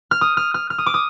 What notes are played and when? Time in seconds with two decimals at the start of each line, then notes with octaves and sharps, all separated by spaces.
0.11 F6
0.21 D#6
0.37 F6
0.54 F6
0.70 F6
0.78 D#6
0.86 D6
0.94 D#6